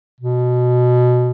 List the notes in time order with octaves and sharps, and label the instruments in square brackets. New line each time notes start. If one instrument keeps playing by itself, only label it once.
[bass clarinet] B2